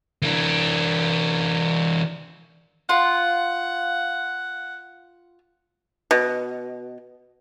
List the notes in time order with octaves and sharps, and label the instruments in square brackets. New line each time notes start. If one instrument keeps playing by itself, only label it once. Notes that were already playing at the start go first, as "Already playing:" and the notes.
[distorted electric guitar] E3 D4
[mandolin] F4 [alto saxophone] F#5
[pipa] B2